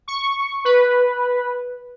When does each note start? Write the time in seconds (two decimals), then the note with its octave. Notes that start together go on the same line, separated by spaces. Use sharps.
0.08 C#6
0.65 B4